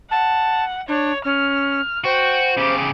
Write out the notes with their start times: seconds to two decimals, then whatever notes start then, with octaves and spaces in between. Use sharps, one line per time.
0.11 F#5 A5
0.88 D4 C#5
1.25 C#4 F6
2.05 F#4 C5 G5
2.57 C#3 G4 D6